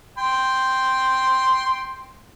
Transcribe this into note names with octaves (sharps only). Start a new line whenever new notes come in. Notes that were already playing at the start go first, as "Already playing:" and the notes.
G5 C6